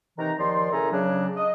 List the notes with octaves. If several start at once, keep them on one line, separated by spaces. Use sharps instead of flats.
C3 D#3 E3 D#4 A#5
D#2 D#3 F3 D5 C6
C#3 E4 A4 A#4 G#5 A#5
C#3 F#3 D4
D#5